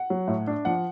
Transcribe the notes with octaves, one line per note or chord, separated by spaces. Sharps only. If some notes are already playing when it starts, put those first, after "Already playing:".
Already playing: F#5
F#3
A2
D4
F3 F#5